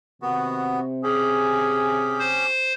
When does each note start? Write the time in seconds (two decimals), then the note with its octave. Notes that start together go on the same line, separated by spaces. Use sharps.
0.22 C3 D#3 B3 F#4
1.03 C#4 G4 G#4
2.19 C5